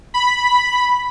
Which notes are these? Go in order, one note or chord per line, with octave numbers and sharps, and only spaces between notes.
B5